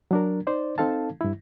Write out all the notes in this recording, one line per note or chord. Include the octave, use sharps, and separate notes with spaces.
F#3 D4 A#4
D#4 C5 D5
C4 D#4 A4 F5 A5
G2 E4